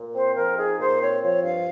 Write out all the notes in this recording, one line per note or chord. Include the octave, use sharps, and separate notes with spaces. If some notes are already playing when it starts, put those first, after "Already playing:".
Already playing: A#2
C4 C5
F3 A#4
D#4 G#4
A#2 C5
C4 C#5
F3 C#5
G2 F5